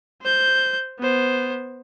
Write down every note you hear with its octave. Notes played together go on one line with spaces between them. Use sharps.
C5 G6
B3 C5